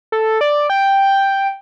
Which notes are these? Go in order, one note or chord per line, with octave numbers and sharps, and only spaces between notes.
A4
D5
G5